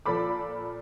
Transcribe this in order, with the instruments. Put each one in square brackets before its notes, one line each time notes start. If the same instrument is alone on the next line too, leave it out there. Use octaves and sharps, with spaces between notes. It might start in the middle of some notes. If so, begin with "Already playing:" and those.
[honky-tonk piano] A#2 F3 A4 B5 D6